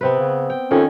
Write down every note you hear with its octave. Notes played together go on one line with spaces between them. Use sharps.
C3 B3 C4 B4
C#3
G5
F2 D#3 C#4